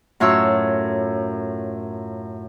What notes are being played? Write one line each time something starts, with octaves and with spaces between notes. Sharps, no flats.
F#2 A2 F4 C#5 E6